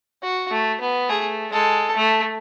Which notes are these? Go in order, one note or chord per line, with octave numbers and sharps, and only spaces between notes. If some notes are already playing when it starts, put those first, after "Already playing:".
F#4
A3
B3
A3 G#4
G#3 A4
A3